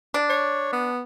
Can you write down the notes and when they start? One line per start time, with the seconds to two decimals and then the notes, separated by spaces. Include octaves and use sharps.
0.14 D4
0.29 C#5
0.72 B3